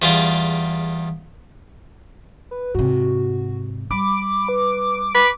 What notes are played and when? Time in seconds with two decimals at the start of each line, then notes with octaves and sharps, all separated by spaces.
0.02 E2 G3 F4 G#4 D6
2.51 B4
2.75 G#2 C3 F#4
3.91 G3 B5 D6
4.49 B4
5.14 B4